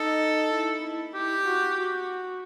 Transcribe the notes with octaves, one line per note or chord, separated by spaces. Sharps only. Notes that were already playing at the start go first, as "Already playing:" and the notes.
Already playing: D#4 A4
E4
E4
E4 G4
F#4
F#4